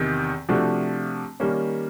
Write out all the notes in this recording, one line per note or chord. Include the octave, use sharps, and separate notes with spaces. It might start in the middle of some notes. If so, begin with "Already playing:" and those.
Already playing: E2 C3 D#3
C3 F3 A3 D4 F#4
D#3 G3 A#3 C#4